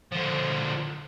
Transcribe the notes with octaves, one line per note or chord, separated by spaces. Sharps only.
D3 F3